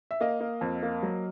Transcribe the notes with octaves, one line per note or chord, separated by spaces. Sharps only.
E5
A#3 D#5 F5
A#3
F2
A#3
F#3